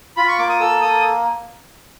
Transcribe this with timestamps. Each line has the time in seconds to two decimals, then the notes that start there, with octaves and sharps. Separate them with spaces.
0.17 F4 B5
0.28 C#6
0.39 A#3 D6
0.49 D#6
0.60 A4 E6
0.81 A#3 D#6